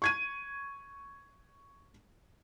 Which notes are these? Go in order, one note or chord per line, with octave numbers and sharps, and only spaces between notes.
C#6 G#6 D#7